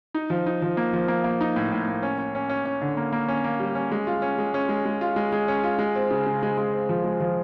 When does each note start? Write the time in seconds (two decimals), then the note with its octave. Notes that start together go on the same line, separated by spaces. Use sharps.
0.15 D#4
0.30 F3
0.46 D#4
0.62 F3
0.77 A#3
0.93 F3
1.08 A#3
1.24 A#3
1.41 D#4
1.56 A2
1.72 A2
1.88 A#3
2.03 C#4
2.18 C#4
2.35 C#4
2.49 C#4
2.65 C#4
2.82 D3
2.97 A#3
3.13 A#3
3.28 C#4
3.44 A#3
3.60 G3
3.75 C#4
3.92 G#3
4.07 F4
4.22 C#4
4.38 G#3
4.54 C#4
4.69 G#3
4.85 G#3
5.01 F4
5.16 G#3
5.33 G#3
5.48 C#4
5.63 F4
5.79 G#3
5.95 C4
6.11 C#3
6.26 C#3
6.43 G#3
6.58 G#3
6.73 C4
6.89 F3
7.04 G#3
7.21 F3